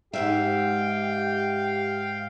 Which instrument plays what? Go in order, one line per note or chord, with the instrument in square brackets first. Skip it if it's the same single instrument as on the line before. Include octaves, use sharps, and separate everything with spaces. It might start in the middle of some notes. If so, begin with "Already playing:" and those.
[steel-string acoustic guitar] G#2 C3 E5 [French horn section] G4 [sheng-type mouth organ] F5 G5